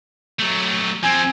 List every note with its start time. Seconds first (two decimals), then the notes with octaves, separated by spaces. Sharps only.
0.40 F#3 A3
1.03 F3 C4 G#5